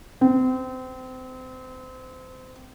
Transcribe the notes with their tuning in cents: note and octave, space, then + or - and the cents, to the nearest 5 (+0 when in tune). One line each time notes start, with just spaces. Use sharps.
C4 -30